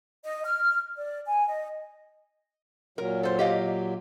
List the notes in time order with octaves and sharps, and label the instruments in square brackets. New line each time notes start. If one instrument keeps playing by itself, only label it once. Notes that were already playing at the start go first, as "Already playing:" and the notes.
[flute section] D#5
F6
D5
G#5
D#5
[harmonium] A#2 F#3 [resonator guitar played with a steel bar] A#4
[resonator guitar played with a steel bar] A4 C5
G4 D#5 F5